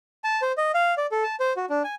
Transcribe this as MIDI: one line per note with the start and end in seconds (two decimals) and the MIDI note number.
0.24 0.41 81
0.42 0.52 72
0.57 0.72 75
0.74 0.94 77
0.98 1.06 74
1.12 1.23 69
1.23 1.36 81
1.40 1.53 72
1.57 1.65 66
1.70 1.83 62
1.84 1.95 80